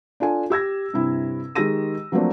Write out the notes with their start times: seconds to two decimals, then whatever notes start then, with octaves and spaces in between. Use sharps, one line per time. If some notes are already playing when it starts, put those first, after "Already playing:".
0.20 D4 F4 A4 G#5
0.50 G4 E6 G#6 A#6
0.93 G2 C3 E4
1.55 D#3 G#3 G4 E6 A#6 D#7
2.12 F3 F#3 A3 A#3 C4 D4